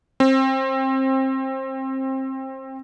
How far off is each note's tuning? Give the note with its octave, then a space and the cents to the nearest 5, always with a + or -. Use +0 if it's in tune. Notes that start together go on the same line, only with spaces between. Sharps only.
C4 +25